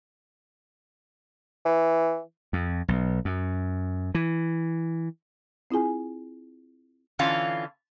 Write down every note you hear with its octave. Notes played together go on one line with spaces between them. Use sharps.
E3
F2
B1
F#2
E3
C4 E4 F4 G#4 G#5
D3 E3 C#4 F4 F5